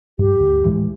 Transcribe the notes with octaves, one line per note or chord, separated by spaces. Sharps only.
G2 G4
D2
A2 E3 G#3